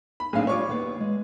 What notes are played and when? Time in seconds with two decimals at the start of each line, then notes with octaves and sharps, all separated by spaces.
0.20 B5
0.33 B1 C4 D4 G#4 F5
0.47 G3 F4 C#5 C#6 D6
0.68 D#2 B3 F5
1.00 G#3